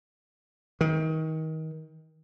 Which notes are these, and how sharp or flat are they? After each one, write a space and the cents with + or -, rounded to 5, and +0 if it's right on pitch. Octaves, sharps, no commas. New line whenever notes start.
D#3 +30